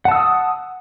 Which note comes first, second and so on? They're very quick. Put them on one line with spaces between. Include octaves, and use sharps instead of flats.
F#5 A5 E6 D#6